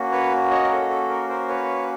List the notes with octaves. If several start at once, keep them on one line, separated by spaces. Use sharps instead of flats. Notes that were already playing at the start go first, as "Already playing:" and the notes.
Already playing: A#3 C#4 F#4
B4 C#5
C#5 D#5
A#4
A4
A4
A#4
A#4 C5
B4 C#5